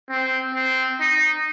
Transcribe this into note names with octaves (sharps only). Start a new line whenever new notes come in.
C4
C4
D#4